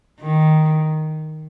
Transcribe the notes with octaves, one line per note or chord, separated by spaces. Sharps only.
D#3